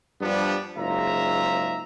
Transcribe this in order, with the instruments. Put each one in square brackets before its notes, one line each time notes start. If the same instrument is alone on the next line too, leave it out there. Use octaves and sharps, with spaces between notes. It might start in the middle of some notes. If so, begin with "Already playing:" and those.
[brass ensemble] G2 F3 G3 B3 D4
F#1 G#2 F4 E5 A#5